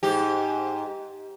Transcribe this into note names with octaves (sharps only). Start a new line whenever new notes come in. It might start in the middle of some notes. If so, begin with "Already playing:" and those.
G#2 G4